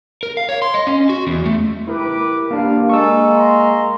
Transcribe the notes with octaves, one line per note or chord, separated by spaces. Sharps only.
A#4
F5
C#5
C6
D#5
C#4
F#4
E2
A3
E4 G4 A#4 B4 D6
A#3 D4 G4 F5
G#3 A#3 A4 C#6 E6
A#5 C6